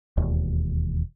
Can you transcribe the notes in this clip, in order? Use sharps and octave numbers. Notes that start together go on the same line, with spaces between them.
E1 D#2